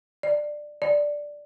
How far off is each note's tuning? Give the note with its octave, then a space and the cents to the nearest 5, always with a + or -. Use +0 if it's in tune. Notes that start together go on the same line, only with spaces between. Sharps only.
D5 +15
D5 +0